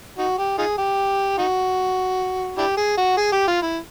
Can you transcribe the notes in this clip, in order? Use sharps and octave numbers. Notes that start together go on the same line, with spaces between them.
D#4 F#4
G4
D#4 F4 G#4
G4
D#4 F#4
D4 E4 G4
G#4
F#4
G#4
G4
F4
E4